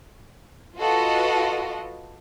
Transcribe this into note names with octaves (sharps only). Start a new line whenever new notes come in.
F4 F#4 A4 B4 D#5